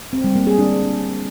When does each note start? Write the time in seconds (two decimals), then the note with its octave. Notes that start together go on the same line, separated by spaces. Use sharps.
0.13 C4
0.24 G3
0.36 A#3
0.47 G#4
0.58 D4